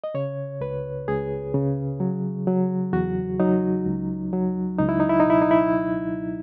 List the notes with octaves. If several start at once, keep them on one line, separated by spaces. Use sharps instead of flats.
D#5
C#3 C#5
C#2 B4
C#2 G#4
C#3
F#3
F#3
E2 F#4
F#3 D#4
C#2
F#3
C#2 D#4
E4
D#4
E4
D#4
B2 E4
D#4
E4